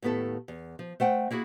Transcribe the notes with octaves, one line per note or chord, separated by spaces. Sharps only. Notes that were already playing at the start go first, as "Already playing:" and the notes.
D#2 A2 B3 E4 A4
E2
F3
A3 C5 F#5 G5
A#3 E4 F#4 G#4